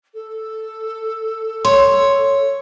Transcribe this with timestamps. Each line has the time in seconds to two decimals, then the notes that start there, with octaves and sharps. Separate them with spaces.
0.14 A4
1.65 C#5 C6